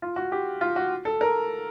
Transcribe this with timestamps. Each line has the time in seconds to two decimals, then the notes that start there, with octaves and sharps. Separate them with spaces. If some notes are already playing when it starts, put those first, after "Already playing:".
0.02 F4
0.16 F#4
0.32 G4
0.61 F4
0.76 F#4
1.05 A4
1.21 A#4